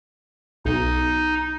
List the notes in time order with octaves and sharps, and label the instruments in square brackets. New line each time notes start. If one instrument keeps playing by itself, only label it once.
[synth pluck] B1 [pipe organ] D#4